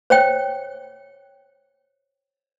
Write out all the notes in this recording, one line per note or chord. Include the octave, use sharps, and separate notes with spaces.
C5 C#5 G5